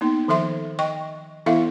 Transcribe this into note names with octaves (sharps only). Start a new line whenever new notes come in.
A#3 B3 D#4
D#3 F3 A4 E5 C6
D#5 G5 C#6
E3 B3 E4 A4 E5 F5